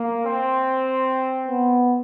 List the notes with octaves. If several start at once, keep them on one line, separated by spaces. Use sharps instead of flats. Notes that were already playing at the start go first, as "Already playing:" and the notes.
Already playing: A#3
C4
B3